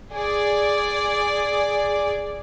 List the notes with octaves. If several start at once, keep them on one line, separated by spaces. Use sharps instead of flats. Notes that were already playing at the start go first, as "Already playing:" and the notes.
G#4 D5